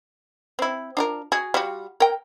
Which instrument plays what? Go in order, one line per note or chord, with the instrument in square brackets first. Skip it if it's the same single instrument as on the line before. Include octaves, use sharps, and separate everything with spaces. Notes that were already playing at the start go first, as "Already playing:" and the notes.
[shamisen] C4 E4
D4 F4 A#4
F#4 G#4
G3 F4 F#4
A#4 G5